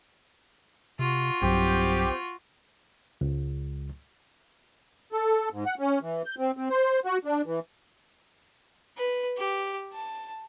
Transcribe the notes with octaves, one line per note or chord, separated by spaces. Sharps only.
C3 F4 F#4
B1 G2 F#3 C4 G4
C#2
A4
G#2
F#5
C#4
E3
G6
C4
C4
C5
F#4
D4
E3
B4
G4
A5